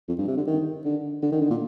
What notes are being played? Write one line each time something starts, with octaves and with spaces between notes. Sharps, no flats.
F2
G2
C3
D3
D#3
D3
D3
D#3
D3
A#2